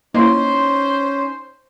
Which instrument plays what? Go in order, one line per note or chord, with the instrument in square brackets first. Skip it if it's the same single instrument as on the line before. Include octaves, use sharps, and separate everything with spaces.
[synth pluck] A#3 E4 [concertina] C#4 [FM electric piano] D#4 C6 [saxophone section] C5